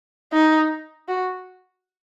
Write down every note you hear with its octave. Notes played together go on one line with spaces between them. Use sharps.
D#4
F#4